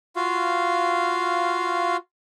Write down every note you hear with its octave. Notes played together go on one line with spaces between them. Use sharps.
F4 F#4 F5